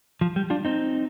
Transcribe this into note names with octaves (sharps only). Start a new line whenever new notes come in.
F3
G3
D4 F4
C4 D#4